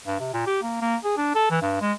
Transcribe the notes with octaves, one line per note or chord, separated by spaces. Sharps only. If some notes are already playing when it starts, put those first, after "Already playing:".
G2
C3
A#2
G4
A#3
A#3
G#4
D4
A4
E3
G2
G#3